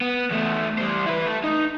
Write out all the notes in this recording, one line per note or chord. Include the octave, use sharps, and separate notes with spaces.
B3
E2 A3
G3 C5
E4 B4
A3
D#4